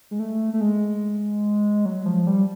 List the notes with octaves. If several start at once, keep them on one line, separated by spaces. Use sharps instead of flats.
G#3
A3
A3
G#3
F#3
F3
G3